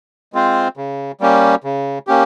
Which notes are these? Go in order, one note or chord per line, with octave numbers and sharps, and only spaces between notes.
G#3 C4 F4 C5
C#3
G3 A#3 C#4 G4
C#3
A#3 C#4 G4